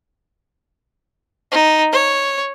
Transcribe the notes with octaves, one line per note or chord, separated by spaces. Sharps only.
D#4
C#5